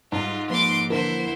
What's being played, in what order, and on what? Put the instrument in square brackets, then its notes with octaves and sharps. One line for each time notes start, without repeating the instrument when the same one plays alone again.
[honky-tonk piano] G#2 [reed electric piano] G3 [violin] F4
[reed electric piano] F3 A#3 B4 [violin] C6 D6
[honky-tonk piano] D3 E3 [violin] E4 C5 [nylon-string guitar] A#4